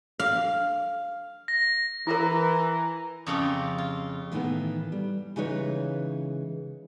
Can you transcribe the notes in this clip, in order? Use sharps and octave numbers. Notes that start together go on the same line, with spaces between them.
F5
A#6
E3 E4 A#4 A#5
F2 C#3 F4 G4
F4
A2 D#3 E3 A3 B3
G3
C#3 E3 G#3 D#4 B4 C#5